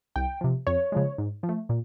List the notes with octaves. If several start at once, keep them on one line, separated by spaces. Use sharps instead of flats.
C2 G5
C3 F3
F2 C#5
C#3 F3 G#3
G#2
F3
A3
A#2